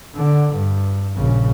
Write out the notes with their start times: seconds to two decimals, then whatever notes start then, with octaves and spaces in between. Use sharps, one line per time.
0.16 D3
0.55 G2
1.16 A#1 C#3